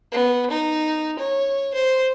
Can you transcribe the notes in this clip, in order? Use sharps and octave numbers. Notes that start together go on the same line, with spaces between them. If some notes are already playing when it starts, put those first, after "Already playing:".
B3
D#4
C#5
C5